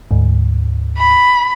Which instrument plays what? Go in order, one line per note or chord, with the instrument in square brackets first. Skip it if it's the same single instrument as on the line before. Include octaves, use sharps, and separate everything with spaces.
[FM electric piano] D2 G#2
[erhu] B5